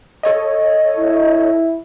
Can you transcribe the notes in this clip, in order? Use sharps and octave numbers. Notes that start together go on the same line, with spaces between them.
A4 C#5 D#5
E4